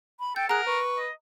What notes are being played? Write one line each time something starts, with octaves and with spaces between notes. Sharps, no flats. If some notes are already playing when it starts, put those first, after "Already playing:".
B5
A4 G5 G6
G#4 A#4 F#5 A#5 F#6
B4 C#6
D#5